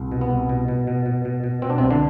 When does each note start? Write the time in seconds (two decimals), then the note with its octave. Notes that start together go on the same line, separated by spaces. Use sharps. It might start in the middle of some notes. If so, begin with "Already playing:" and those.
Already playing: C2
0.12 B2
0.21 B3
0.31 C2
0.49 B2
0.68 B2
0.87 B2
1.06 B2
1.25 B2
1.44 B2
1.62 B2 C4
1.70 D4
1.78 C2 C3 C4
1.91 D3 D4